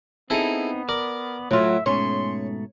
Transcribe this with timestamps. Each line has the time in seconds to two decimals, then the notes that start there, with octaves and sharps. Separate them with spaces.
0.30 B3 C4 D#4 E4 G#4 A4
0.89 A#4 D5
1.51 A2 F#3 F4 E5
1.86 G#2 B2 A3 C#4 C#5 C6